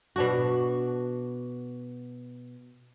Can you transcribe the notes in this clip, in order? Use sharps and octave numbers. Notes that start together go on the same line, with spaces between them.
B2 D4 F#4